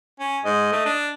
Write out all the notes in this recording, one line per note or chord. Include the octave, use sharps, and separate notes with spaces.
C#4
G#2 D#5
A3
D4